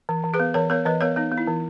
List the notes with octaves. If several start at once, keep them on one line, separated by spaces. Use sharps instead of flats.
E3
E3
G#4 B4
B3
E3 A#4 C#5
B3 A#4 C#5
E3 B4 D#5
B3 A#4 C#5
B3 D#4
B3
E4
E3